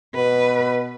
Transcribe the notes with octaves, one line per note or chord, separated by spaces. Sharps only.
B2 B4